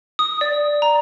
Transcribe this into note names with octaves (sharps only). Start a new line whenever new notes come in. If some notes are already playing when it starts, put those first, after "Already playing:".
D#6
D5
A#5